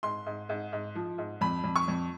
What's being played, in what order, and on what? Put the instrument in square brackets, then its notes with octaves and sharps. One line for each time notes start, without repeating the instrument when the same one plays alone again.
[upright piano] G#2 C6
G#2
G#2
G#2
F3
G#2
F2 B5
F2
C#6
F2